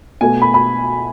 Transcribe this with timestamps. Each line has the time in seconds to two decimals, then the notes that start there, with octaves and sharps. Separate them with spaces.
0.21 B2 A3 G#5
0.42 B5
0.54 B5